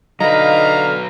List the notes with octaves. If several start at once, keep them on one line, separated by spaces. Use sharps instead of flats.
D3 F#3 D#4 B4 F5 A#5